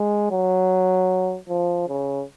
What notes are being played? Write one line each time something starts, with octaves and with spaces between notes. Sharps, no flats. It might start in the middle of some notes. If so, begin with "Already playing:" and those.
Already playing: G#3
F#3
F3
C#3